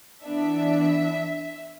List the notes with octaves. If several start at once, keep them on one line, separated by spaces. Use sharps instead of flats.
E3 B3 D4 E5